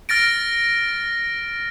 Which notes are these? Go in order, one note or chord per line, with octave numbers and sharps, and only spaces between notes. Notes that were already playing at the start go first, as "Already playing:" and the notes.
F6 A6 A#6 D7